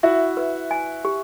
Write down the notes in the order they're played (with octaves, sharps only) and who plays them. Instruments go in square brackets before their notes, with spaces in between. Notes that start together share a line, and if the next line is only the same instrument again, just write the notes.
[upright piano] E4 F#4 [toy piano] E5
[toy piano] B4
G#5
G4